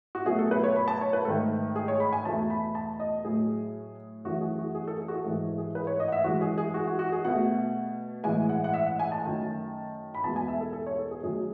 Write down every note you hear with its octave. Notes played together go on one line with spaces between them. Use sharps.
F#4
B2 F#3 A3 G#4
A4
B4
C#5
B5
A5
C#5
B4
G#2 D#3 A3 A4
G#4
C#5
B5
G#5
E2 B2 A3 A5
B5
A5
D#5
A2 F#3 A3 G#4
F#2 E3 A3 F#4
G#4
F#4
G#4
A4
G#4
F#4
G#4
G#2 E3 G#3 A4
G#4
B4
C#5
D#5
F#5
E5
F#2 E3 G#3 F#4
G#4
G#4
F#4
F#4
F#4
G#4
B2 A3 F#5
A2 E3 G#3 G#5
F#5
F#5
E5
F#5
G#5
A5
F#2 D#3 A3
B5
E2 B2 G#3 A5
G#5
E5
A4
A4
C#5
A4
G#4
F#2 D#3 F#3 A3 G#4